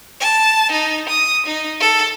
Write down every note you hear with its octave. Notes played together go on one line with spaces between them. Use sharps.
A5
D#4
D#6
D#4
A4